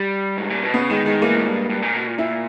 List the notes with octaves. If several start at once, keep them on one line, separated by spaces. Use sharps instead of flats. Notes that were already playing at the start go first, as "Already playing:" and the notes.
Already playing: G3
G#2
A#2
B2
C#3 B3
D#3 G#3
D#3 G#3
E3 A#3
G#2
G2
G2
A#2
B2
A#2
A#2 E4